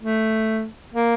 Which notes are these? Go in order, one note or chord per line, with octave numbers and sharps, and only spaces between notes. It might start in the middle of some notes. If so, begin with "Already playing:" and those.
A3
A#3